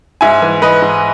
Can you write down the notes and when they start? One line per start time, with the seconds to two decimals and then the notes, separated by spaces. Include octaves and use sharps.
0.21 G#2 E5 G#5
0.42 E3
0.62 E3 B4 D#5
0.82 G#2